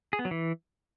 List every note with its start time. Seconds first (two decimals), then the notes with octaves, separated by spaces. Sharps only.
0.13 G#4
0.19 B3
0.25 F#3
0.31 E3